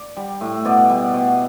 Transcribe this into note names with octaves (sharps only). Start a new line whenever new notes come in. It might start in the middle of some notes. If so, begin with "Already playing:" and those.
Already playing: D5
G3
A2
B2 D5
G3
B2